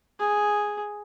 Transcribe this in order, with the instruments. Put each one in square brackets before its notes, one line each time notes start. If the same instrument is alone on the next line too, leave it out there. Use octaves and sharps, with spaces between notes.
[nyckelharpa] G#4